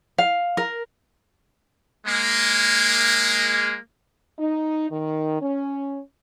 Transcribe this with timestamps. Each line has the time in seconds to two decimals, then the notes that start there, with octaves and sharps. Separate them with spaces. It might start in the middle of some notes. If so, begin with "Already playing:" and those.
0.18 F5
0.57 A#4
2.06 G#3 A#3
4.39 D#4
4.91 D#3
5.41 C#4